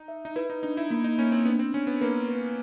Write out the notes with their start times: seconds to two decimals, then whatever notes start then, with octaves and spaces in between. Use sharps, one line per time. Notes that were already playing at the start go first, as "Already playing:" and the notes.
Already playing: D#4
0.08 E5
0.25 D#4
0.36 E4 B4
0.50 D#4
0.63 D4 D#4
0.77 E4
0.90 A#3 E4
1.04 D#4
1.18 A#3 C#4
1.32 C4
1.45 B3 D4
1.59 C4
1.74 C#4 D4
1.87 B3
2.01 A#3 B4
2.28 B4